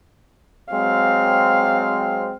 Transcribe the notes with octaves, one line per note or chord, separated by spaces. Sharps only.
F#3 G#3 C4 F5